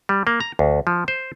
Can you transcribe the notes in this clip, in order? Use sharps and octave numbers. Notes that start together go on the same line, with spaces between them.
G3
A#3
A#5
D2
F3
C5